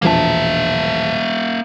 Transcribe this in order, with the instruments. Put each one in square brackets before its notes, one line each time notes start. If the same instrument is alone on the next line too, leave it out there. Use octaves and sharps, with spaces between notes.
[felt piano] E1 A#1 A5 [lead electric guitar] A#3 E5